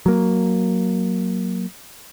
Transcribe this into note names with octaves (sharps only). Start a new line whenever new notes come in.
F#3 A#3